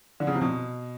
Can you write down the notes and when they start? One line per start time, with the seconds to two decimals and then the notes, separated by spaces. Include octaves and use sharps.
0.20 D3
0.27 C#3
0.34 C3
0.41 B2